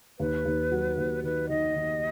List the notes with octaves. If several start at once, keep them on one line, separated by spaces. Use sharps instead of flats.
D#2 B4
D#2
F#3
D#2
D#3 B4
D#3 D#5
D#3